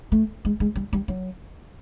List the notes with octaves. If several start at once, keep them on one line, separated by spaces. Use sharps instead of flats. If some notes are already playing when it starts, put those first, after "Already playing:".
A3
G#3
G#3
G3
G3
F#3